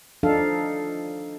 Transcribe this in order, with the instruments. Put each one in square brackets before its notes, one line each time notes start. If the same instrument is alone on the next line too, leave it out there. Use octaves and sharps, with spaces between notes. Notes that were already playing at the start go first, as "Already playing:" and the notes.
[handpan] F3 D4 D#4 A4 F5